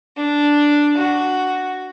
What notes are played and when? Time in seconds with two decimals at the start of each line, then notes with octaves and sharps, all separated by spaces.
0.16 D4
0.97 F#4